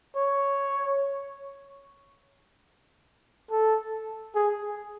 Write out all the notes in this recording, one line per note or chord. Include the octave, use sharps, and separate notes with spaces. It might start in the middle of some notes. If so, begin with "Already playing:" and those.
C#5
A4
G#4